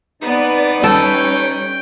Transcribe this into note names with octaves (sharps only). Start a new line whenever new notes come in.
B3 C4 D#4 B4 D5
G3 C#4 A4 C#5 G5